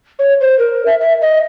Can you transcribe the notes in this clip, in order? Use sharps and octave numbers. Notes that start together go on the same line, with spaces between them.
C#5
C5
A#4
E5
E5
D#5